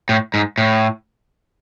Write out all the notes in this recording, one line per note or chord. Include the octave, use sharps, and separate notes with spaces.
A2
G#2
A2